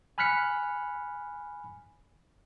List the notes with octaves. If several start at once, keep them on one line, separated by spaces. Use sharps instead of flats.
G#5 B5 F6 F#6 B6 C#7